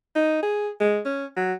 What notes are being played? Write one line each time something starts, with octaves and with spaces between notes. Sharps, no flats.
D#4
G#4
G#3
C#4
F#3